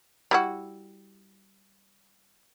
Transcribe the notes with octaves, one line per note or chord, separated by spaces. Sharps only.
G3 E4 F#4